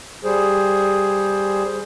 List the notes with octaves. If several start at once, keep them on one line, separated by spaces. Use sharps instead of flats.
G3 G#4 C5